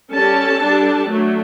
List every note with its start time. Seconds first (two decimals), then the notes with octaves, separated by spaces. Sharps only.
0.12 G3 C#4 A4 A5
0.60 G3 D4
1.09 F#3 A3 D4